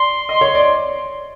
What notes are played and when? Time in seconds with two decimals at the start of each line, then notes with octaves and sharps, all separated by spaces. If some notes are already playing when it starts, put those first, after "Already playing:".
Already playing: D5 C6
0.29 D#5
0.41 C#5
0.55 D5